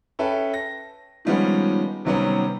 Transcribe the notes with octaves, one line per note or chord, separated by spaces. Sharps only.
C#4 A4 B4 E5 G5
A#6
D#3 F3 G3 G#3 B3 C#4
C3 D#3 F#3 G3 B3 C#4